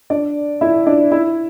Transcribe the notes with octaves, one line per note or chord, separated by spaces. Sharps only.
D4 D5
E4 E5
D4 D5
E4 E5